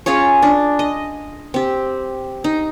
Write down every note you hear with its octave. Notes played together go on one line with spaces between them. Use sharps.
C#4 F4 G#4 C#5
D4
D#5
C4 G4
D#4